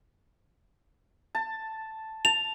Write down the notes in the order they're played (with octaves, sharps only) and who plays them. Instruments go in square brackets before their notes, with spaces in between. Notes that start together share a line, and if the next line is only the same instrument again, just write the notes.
[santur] A5
[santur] A5 [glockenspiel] F7